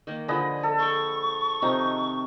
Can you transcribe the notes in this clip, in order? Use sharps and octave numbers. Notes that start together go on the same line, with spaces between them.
D#3 A#3
D3 F3 G#4 B4 D#5
A4
G5 C6 C#6
C3 D#3 F3 D#4